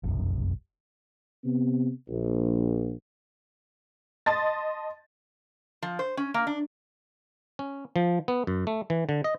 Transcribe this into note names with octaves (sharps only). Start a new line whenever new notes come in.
F1 B1 F#2
C3 B3
A#1
D#5 A5 C6 A6
F3
C5
C#4
A#3
D4
C#4
F3
B3
F#2
A3
E3
D3
D#5